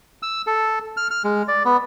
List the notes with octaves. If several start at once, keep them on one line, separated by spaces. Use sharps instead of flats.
E6
A4
F6
F6
G#3
D5
B3